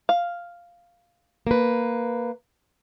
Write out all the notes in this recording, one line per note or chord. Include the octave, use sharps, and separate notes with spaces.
F5
A#3 B4